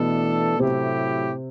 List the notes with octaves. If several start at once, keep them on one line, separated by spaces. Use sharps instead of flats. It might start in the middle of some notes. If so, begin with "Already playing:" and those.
Already playing: B2 E3 A3 B3 D4 A4
A2 C3 F#3 A3 C4 E4 G4